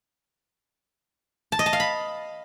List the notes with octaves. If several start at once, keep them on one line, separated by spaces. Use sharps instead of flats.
A5
D#5
A5
F5
B5